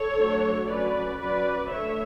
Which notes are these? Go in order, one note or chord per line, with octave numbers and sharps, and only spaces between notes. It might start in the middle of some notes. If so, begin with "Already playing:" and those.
Already playing: A4 C#5
F#3 A3 D4
F#3 C#4 B4 D5
F#3 C#4 B4 D5
D3 A3 D4 C#5 E5